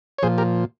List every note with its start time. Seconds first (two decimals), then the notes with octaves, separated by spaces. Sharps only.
0.18 C#5
0.23 A#2 F3 G#4 C5
0.38 G4 A#4